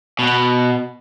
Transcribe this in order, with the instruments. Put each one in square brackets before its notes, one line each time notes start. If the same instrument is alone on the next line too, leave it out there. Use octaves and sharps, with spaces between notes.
[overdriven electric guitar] B2